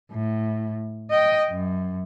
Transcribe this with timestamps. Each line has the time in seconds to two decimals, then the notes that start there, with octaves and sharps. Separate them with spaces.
0.12 A2
1.11 D#5 G5
1.51 F#2